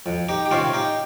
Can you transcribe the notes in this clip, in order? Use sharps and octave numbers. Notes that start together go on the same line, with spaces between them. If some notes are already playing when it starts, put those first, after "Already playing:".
F2
D#4 G4
G4
C3 D#3 C#4 F4
D#4 G4